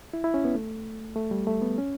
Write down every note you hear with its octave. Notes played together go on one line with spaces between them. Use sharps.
E4
E4
C#4
B3
A3
A3
G3
A3
B3
C#4